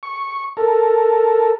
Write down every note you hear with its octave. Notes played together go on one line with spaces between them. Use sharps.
C#6
A4 A#4